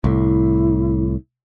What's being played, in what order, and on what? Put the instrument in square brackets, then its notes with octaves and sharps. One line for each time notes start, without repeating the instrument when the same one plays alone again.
[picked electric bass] C2 A2 [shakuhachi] E4